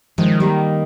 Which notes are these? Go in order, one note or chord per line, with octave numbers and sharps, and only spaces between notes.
D#3 F3 G#3
G3 A#3